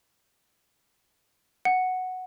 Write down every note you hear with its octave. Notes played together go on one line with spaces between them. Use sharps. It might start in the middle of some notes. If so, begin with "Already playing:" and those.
F#5